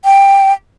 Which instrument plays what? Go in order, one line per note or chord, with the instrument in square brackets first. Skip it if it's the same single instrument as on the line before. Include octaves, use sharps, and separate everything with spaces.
[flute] G5